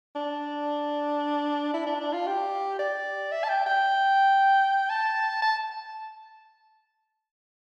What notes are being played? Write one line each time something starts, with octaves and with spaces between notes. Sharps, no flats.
D4
E4
D4
D4
F4
G4
D5
E5
A5
G5
G5
A5
A5